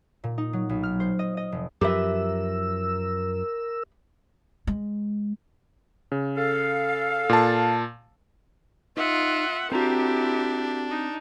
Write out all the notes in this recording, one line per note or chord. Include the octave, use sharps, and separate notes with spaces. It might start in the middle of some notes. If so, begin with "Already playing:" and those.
A#2
D#4
F#3
B1
F6
C5
D#5
D#5
F1
F#2 F3 G4 A#4 B4 E5 E6
G#3
C#3
A4 F5
A#2 A5
D#4 F4 E5 F#5
C4 D4 E4 F#4 G4 A4 A#5
D#4